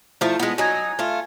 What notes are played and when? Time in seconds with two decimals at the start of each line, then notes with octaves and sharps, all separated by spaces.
0.21 F3 A3 E4 F4
0.40 G#3 B3
0.58 F#3 D#4 G#5 G#6
0.99 A3 F4